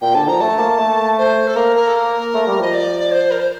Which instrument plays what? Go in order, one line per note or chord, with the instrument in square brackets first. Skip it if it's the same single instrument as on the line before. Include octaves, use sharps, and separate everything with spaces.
[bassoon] A#2 [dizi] G5
[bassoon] D3 [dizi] A5
[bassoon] F3 [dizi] A#5
[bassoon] A3 [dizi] A5
[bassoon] A#3
A3
[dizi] C5
A4
[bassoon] A#3 [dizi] A#4
[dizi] A#4
A4
A#4
[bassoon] A3
G3
[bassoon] F3 [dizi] D#5
[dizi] D5
C5
A#4
C5